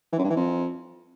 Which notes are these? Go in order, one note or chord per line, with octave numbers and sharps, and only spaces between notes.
E3
F#2
G2
E3
F2